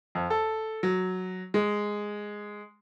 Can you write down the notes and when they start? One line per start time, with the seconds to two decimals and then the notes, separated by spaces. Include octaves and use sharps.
0.15 F2
0.30 A4
0.83 F#3
1.54 G#3